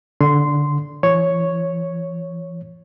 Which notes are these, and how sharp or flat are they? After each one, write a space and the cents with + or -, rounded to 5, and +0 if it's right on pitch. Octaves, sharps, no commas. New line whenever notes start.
D3 -10 C6 -10
E3 +40 C#5 +0